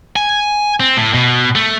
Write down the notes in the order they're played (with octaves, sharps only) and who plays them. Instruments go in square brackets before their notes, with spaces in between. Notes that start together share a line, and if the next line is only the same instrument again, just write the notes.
[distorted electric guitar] G#5
C4
A2
B2
A3